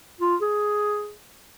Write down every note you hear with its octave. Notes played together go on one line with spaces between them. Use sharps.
F4
G#4